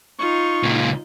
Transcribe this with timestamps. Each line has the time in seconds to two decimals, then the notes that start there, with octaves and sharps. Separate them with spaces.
0.19 D#4 F4 C#6
0.63 C#2 A#2